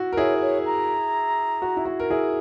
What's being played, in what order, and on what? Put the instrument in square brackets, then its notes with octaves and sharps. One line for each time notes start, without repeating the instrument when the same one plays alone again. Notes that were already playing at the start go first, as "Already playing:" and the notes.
Already playing: [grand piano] E4 F#4
A#4
[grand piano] E4 G#4 [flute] C#5
[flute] C#5
A#5
[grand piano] F#4
E4
F#4
A#4
E4 G#4